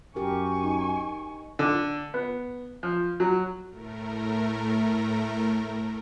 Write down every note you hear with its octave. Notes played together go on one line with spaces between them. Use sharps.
F#2 G4 A#4 G#5 C#6
D#4
D3
B3
F3
F#3
A2 A3 A#4